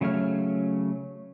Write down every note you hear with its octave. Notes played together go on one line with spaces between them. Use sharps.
C#3 F#3 A3 C#5 F6